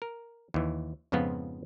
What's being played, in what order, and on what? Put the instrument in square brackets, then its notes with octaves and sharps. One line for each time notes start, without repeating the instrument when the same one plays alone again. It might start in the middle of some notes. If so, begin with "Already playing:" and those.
[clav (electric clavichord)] A#4
D#2 E3
F2 G#2 C#3 F3 B3 F4